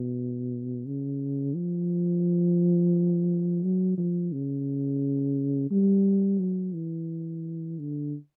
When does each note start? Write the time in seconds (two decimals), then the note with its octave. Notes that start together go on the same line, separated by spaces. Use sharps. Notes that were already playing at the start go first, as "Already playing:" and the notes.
Already playing: B2
0.86 C#3
1.55 F3
3.63 F#3
3.98 F3
4.32 C#3
5.71 G3
6.40 F#3
6.74 E3
7.79 D3